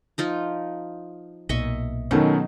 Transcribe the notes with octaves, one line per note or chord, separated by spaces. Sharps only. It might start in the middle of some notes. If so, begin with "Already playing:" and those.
F3 D#4 F4
B1 A#2 D#5 E5 C#6
B2 D#3 F#3 C#4 D#4 A4